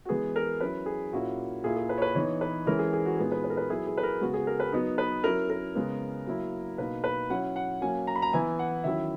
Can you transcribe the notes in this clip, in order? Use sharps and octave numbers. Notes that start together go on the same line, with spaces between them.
F#4
E3 G#3 B3 G#4
A#4
F#3 C#4 E4 B4
G#4
A#2 A#3 C#4 E4 F#4
A#2 A#3 E4 G#4
G#4
B4
C#5
B4
E3 B3 D#4 C#5
B4
E3 G#3 C#4 E4 A#4
G#4
G#4
F#4
A#2 G#3 B3 D#4 G#4
B4
B4
A#4
B4
F#3 B3 E4 G#4
G#4
B4
A#4
C#3 G#3 B3 F#4
G#4
A#4
B4
F#3 B3 D#4
B4
F#3 C#4 E4 A#4
A#4
C#3 G#3 B3
F#3 A#3 E4
B2 A#3 D#4 B4
B4
F#3 C#4 E4 F#5
F#5
F#3 A#3 C#4 G#5
A#5
B5
A#5
E3 B3 E4 G#5
F#5
D#3 F#3 C#4 E4 E5